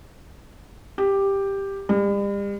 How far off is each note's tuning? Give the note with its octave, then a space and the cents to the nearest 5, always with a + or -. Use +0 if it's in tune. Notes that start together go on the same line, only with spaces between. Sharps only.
G4 +5
G3 +40